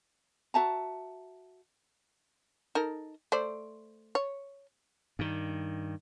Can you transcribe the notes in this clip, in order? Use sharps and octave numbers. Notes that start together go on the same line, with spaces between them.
F#4 E5 A5 A#5
D#4 A4 A#4
A3 C5 D5
C#5
G2 D#3